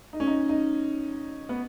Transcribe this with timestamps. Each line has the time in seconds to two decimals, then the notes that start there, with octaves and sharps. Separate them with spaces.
0.13 D#4
0.20 C#4
0.27 D#4
0.49 D#4
1.49 B3